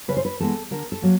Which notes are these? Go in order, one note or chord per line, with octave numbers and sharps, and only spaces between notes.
C#3 B4
C5
B4
E3 G#3 B3 A4
D3 A#4
A4
F#3 A#3